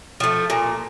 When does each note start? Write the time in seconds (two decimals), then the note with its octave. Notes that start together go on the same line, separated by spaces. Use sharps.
0.20 F3 A3
0.50 A#2